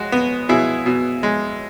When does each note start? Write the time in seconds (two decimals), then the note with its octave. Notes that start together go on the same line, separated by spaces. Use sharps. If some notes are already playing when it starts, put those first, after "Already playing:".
Already playing: G#3 F#4
0.12 B3
0.49 B2 E4 G#4
0.86 B2
1.23 G#3